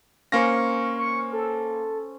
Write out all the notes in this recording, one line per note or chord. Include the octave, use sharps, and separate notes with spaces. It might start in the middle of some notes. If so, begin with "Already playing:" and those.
A#3 C#4 C5 F5 C#6 A#6
C#6
A4